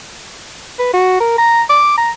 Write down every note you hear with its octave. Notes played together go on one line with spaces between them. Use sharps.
B4
F#4
A#4
A#5
D6
A#5